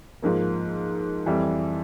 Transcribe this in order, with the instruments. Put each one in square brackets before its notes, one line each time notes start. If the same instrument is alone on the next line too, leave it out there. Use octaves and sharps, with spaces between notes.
[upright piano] G#2 F3 A#3
F2 E3 G3